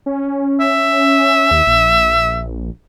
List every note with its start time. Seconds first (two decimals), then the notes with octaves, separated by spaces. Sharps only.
0.06 C#4
0.60 E5
1.51 D#2
1.67 A#1